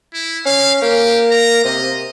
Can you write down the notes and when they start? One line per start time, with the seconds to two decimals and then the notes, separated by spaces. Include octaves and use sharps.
0.14 E4
0.46 C#4 F5
0.82 A#3 G4
1.30 A#5
1.64 C3 D#5